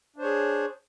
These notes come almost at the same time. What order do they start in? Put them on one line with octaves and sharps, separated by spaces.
D4 C5 C#5 G#4